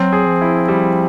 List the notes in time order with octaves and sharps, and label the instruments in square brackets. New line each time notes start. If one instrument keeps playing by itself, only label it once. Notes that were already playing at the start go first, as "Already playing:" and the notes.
Already playing: [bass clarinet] F#3 [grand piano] C4
[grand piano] G#4
[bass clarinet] F3
[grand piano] E4
G3